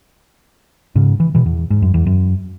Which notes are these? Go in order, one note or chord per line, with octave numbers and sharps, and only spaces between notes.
G#2 C#3
E3
B2 E3
E2
G#2
F#2
E2
F#2